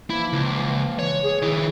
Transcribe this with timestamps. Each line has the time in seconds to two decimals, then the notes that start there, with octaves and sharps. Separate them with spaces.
0.10 E3 F3 A#3 E4
0.33 C#2
0.99 E3 C#5
1.24 G#4
1.42 D#3 E4